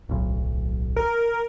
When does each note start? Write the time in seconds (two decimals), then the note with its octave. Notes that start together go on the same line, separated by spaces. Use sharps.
0.09 D1 B1
0.96 A#4